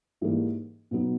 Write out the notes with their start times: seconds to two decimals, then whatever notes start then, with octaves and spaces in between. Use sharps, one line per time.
0.21 G#2 E3 G3 A#3
0.91 B2 F#3 B3 D#4